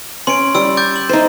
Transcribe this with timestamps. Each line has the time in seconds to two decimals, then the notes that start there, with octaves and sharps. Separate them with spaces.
0.27 C#4 C6 D7
0.55 G3 E6 D7
0.77 D6 G6 A6
0.92 D6 F#7
1.09 D#4 C5